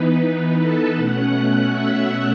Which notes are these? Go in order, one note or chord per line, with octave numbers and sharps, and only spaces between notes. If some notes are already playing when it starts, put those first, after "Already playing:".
Already playing: E3 B3 D#4 B4
B4
A4 A5
B2 A3 C#4 F#5 F#6
E5 E6